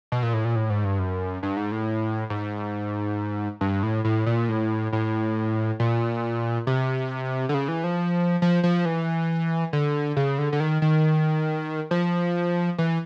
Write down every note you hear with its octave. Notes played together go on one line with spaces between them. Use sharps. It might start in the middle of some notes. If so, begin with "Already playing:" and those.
B2
A#2
A2
A#2
A2
G#2
G2
F#2
G2
G#2
A2
G#2
G2
A2
A2
A#2
A2
A2
A#2
C3
D3
C#3
E3
F3
F3
F3
E3
D3
C#3
D3
D3
D#3
D#3
F3
E3